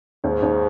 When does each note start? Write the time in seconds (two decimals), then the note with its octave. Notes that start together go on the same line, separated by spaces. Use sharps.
0.24 D#2 G#2
0.42 D#2